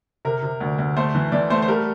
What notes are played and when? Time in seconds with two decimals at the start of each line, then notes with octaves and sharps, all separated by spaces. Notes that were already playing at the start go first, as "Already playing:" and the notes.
0.25 C3 A#4
0.43 C3
0.61 D2
0.78 D2
0.97 A3 C5
1.15 E3
1.32 E3 D5
1.50 A3 C5
1.62 C5
1.68 G3 A#4